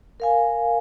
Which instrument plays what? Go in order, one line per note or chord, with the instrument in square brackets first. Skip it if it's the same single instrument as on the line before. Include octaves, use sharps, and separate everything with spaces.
[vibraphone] A#4 F5 G#5